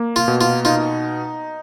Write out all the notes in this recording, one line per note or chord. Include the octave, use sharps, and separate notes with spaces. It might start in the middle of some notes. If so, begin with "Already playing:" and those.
Already playing: A#3
F4
B2
F4
D#4 F4